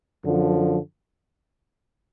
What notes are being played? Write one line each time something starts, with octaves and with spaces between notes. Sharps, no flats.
F#2 D3 F3